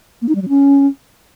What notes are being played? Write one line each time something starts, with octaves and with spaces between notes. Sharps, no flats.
A#3
D#4
G3
F#3
C#4